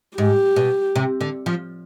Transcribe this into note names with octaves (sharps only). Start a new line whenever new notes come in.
G#2 G4
B2
C3
D3
F3